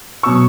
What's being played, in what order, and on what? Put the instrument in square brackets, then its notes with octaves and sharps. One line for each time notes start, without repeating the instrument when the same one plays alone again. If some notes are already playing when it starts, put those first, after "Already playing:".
[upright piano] B2 F#3 C#6 E6